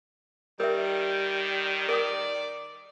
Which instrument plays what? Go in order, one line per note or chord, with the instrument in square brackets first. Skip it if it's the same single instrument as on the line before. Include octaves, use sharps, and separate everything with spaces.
[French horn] D#3 [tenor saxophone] G3 [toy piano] A#4 E5
[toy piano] A#4 G5 D#6 [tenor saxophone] D5